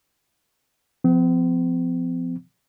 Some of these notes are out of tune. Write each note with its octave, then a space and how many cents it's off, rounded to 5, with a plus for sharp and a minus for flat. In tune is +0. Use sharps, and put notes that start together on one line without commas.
F3 +0 C4 -45